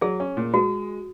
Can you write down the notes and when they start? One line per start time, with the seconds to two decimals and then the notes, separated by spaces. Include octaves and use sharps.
0.01 F#3 G#4
0.20 C#4
0.37 A#2
0.54 G#3 F#4